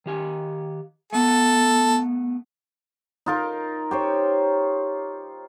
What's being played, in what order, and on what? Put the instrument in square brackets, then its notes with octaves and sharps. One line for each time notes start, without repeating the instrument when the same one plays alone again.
[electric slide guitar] D#3 G4 G#5
[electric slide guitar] A3 B3 [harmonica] A4
[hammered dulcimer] D#4 F4 A#4
G4 C5 C#5